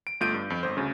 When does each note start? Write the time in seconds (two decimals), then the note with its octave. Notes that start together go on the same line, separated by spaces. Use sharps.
0.07 D7
0.20 G1 A3 F4 G6 D7 D#7
0.34 G2
0.50 F2
0.63 G1 C5
0.77 D2 C#3